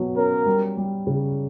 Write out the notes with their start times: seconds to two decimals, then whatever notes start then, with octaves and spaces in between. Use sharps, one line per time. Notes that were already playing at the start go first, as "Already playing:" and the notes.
Already playing: B2 F#3
0.16 C#4 A#4
0.46 G3
0.77 G3
1.07 C#3